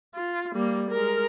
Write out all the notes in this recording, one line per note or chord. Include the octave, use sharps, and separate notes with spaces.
F4
G3 A#3
G#3 A#4